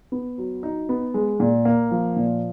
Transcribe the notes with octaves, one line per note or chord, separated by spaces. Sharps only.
B3
F#3
D#4
B3
G#3
A#2
A#3
F3
A#2